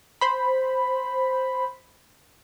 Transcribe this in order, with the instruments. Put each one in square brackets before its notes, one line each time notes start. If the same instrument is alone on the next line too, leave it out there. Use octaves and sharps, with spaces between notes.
[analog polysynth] C5 B5